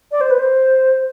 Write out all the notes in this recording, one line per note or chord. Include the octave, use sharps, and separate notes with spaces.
D5
C5
B4
C5